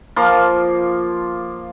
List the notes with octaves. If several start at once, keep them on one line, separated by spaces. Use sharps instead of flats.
F3 A#3 F4